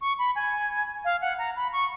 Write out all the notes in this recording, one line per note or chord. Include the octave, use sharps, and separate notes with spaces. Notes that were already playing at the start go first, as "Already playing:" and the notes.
C#6
B5
G#5
F5
F#5
A#5
B5
C#6